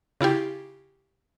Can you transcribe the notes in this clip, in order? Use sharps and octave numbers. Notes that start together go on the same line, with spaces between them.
C#3 E4 F4 G4